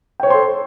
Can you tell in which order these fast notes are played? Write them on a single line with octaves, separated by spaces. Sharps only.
G5 C#5 C5 C6 A4